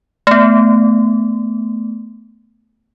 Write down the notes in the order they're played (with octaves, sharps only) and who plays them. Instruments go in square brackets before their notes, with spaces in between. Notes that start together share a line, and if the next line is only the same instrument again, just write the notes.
[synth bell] A3 B3